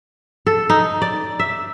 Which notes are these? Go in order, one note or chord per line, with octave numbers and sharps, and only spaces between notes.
A4
D#4
D5
E5